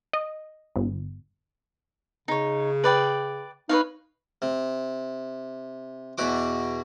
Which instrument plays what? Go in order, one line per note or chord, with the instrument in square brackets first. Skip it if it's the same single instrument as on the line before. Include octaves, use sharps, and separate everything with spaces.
[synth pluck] D#5
G1
[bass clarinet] C#3 [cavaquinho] D#4 C#5
[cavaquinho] B4 D5 G5
[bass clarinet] D#4 [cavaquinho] B4 C#5 F5
[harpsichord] C3
E2 B2 F#4 D6